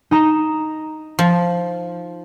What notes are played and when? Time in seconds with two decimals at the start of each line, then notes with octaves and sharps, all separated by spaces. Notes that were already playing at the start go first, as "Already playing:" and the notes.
0.11 D#4 A#5 E7
1.19 F3